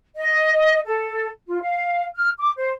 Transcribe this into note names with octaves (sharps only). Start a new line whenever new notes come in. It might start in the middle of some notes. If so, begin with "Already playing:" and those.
D#5
A4
F4
F5
F6
D6
C5